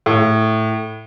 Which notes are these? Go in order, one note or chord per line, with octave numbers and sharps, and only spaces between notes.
A2